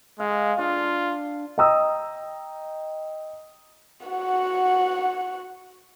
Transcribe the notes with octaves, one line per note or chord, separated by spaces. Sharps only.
G#3 F5
D4 F4
D#5 G5 A#5 D#6 E6
F#4 F#5